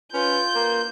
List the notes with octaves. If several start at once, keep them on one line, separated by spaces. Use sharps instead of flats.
C#4 F4 B4 G6
A#3